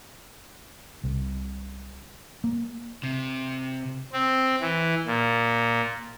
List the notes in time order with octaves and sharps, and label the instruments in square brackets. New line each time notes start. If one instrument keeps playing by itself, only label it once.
[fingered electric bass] C2
A#3
[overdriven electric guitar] C3
[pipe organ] C4
E3
A#2